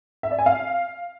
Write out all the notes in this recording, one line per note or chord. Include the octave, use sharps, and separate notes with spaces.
E5
D5
G#5
F5